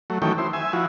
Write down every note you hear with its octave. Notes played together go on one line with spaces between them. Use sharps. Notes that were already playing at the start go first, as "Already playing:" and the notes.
F#3 A3
D#3 E3 F#3 A3 C#4 G5
E4 C5
E5 G#5
F3 E4 F#4